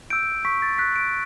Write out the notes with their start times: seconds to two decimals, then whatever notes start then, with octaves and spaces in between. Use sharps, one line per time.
0.10 E6 G6 D7
0.45 C#6 B6
0.62 A6
0.78 F#6 B6
0.96 D7